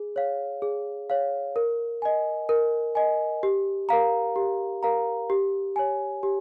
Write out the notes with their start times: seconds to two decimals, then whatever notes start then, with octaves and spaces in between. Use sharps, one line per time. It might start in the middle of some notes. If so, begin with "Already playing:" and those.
Already playing: G#4
0.16 C#5 F5
0.62 G#4
1.10 C#5 F5
1.56 A#4
2.02 D#5 G#5
2.49 A#4
2.95 D#5 G#5
3.43 G4
3.89 A#4 F5 A#5
4.36 G4
4.83 A#4 F5 A#5
5.30 G4
5.76 C#5 G#5
6.23 G4